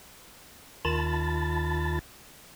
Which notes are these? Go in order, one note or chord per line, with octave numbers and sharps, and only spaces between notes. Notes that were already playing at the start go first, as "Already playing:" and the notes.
D#2 D#3 F4 A5 B5 A6